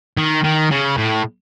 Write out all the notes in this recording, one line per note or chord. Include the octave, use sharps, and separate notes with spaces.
D#3
D#3
C#3
A2